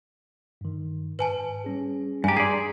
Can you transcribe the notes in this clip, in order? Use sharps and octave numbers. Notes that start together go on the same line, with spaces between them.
G2 D#3
G#2 B4 G#5 A5
G3 C#4 G#4
G2 G4 G#5 A#5
G#4 D5 A#5 C6 G#6